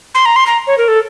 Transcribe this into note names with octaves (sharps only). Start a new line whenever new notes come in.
C6
A#5
C6
A#5
C#5
A#4
A4